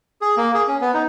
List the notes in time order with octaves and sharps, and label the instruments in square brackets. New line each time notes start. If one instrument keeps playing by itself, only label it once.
[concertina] G#4
A#3
G#4
C#4
B3
D#4